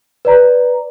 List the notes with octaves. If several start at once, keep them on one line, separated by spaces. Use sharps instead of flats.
B4 D5 A#5